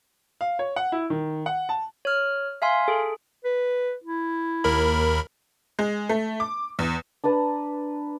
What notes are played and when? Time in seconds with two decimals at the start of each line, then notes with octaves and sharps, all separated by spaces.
0.41 F5
0.59 C#5
0.76 F#5
0.92 E4
1.10 D#3
1.46 F#5
1.69 A5
2.05 C#5 F6
2.62 E5 F5 G#5 C6
2.88 G#4 A4
3.45 B4
4.04 E4
4.64 D#2 A#4 B5
5.79 G#3
6.09 A3
6.40 D6
6.79 E2
7.24 D4 B4 A5 A#5